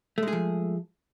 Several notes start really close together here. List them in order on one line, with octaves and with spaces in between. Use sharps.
A3 G#3 G#4 F3